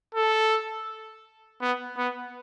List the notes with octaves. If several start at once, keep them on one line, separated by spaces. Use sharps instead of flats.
A4
B3
B3